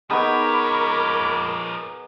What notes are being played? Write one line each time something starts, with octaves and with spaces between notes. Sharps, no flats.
F3 B3 D#4 G#4 A#4 C#5 B5 D6